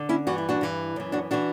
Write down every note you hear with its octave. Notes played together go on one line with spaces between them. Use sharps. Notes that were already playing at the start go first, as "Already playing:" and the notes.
Already playing: D3
C#4 E4
G2 E3 F#4
E4
D4 F#4
G2 E3
F#2 E3
D4 F#4
E3 D4 F#4